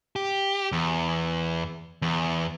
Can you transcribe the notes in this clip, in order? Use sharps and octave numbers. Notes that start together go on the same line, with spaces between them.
G4
E2
E2